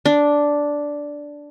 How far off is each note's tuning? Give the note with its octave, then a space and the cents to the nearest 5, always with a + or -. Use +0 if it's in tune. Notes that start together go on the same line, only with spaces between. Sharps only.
D4 -5